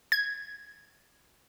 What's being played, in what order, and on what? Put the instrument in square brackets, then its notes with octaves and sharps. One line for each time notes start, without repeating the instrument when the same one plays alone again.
[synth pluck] G#6